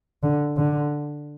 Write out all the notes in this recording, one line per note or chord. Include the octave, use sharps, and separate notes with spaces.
D3
D3